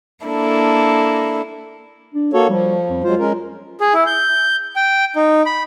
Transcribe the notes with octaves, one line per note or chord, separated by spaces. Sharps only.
A#3 D4 E4 A4
D4
A#3 F#4 A4 C#5
F3 G3
F2
F#3 G#3 F4 C5
G#3 C#4 A#4
G#4
E4
G6
G5
D#4
B5